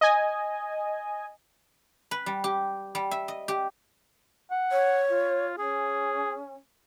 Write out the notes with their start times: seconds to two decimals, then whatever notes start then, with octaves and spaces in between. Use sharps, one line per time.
0.01 D#5 G#5
2.11 B4
2.26 G3
2.44 G4
2.95 G3
3.11 E5
3.28 D#5
3.48 G4
4.51 F#5
4.71 C#5
5.11 F4
5.58 C#4 G#4